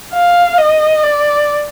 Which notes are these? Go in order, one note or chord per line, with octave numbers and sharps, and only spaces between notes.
F5
D#5
D5